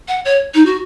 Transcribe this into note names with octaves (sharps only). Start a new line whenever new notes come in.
F#5
C#5
D#4
F#4